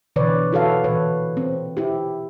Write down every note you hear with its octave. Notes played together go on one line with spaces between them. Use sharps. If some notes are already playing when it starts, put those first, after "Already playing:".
B2 D3 E3 B4 C#5 D5
E4 F#4 A4 B4 C#5 F5
A#2 E3 B4 C#5
C4
E4 G4